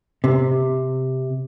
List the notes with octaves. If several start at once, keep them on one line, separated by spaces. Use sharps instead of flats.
C3